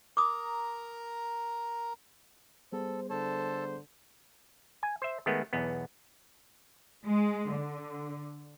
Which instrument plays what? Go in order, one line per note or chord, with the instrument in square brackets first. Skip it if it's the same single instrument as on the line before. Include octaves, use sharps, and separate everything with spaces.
[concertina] A#4 A#5 [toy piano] D6 D#6
[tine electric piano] G3 B3 G#4 [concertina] A4 [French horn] C5
[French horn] D3 [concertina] A4 A5 [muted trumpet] C5
[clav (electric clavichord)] G#5
C5 E5
D#3 G#3 A3 B3
B1 E2 B3
[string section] G#3
D3